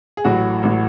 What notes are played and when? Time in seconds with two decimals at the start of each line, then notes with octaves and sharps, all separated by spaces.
0.17 G#4
0.24 A1 A2 F#3 F#4
0.63 A1 A2 F#3